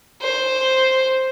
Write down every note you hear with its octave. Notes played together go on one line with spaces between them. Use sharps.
C5